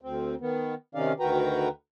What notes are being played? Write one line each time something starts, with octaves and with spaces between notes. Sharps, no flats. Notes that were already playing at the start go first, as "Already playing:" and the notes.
D2 C4
D#3 B3
C3 D#3 C#4 D#4 D5 F5
D2 D#3 F#4 B4 G5 A#5